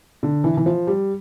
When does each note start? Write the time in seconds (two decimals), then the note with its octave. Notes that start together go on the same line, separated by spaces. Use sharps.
0.23 D3
0.44 E3
0.57 E3
0.66 F3
0.87 G3